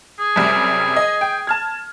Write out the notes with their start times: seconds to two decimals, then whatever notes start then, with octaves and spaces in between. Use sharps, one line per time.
0.19 G#4
0.36 F#2 C3 G3
0.96 D#5
1.21 G5
1.47 A5 F6 G#6